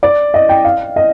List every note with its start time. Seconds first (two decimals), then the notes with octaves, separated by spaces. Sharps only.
0.03 D5
0.34 D#5
0.49 G5
0.65 F5
0.96 D#5